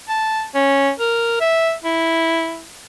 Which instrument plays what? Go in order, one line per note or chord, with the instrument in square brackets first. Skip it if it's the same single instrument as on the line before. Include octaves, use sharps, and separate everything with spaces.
[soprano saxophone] A5
C#4
A#4
E5
E4